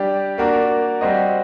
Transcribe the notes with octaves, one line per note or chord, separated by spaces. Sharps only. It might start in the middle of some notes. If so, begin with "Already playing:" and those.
Already playing: G3 D4 G4
A#3 D4 F#4 A#4
G3 C4 F#4 C5 D#5